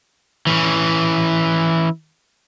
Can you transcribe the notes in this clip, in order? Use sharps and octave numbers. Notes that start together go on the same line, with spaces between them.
E3 C#4